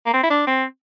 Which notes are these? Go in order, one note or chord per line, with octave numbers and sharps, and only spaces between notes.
A#3
C4
E4
D4
C4